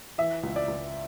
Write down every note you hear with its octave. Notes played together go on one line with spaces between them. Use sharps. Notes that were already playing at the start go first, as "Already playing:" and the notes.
E3 E5
C#2
D5
C#2